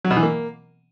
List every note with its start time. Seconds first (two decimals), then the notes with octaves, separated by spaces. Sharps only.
0.05 F#3
0.11 B2
0.17 E3
0.23 A#3